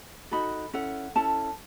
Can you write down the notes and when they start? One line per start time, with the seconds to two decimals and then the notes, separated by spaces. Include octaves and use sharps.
0.31 D#4 F#4 A4 B5
0.73 C#4 E4 A4 F#5
1.15 C#4 E4 A4 A5